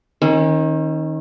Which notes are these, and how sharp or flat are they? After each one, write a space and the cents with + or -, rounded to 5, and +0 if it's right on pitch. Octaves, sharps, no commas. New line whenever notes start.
D#3 +15 C#4 -35